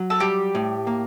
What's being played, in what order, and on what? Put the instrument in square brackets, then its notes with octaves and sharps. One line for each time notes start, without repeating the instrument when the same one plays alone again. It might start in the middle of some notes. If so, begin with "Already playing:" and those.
Already playing: [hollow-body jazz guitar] F#3
[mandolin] A4
[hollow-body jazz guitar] G3 [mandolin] G4
[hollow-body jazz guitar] A2
A#3